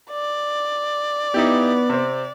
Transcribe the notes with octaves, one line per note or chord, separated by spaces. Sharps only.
D5
B3 D#4 E4 G4
C3 C4